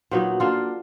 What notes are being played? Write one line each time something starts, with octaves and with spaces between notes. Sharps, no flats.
A#2 F#3 B3 D#4
A#3 D4 F4 A4